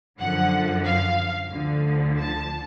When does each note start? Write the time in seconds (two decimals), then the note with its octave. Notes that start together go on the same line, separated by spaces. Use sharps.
0.19 F#2 D3 F3 F#5
0.85 F5
1.52 D2 D3 F3
2.18 A5